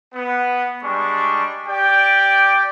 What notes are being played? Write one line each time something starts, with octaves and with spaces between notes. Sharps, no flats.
B3
G3 G#3 D4 C#6
G4 D5 G5